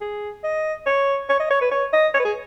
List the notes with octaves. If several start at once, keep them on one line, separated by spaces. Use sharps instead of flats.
G#4
D#5
C#5
C#5
D#5
C#5
B4
C#5
D#5
C#5
B4
G#4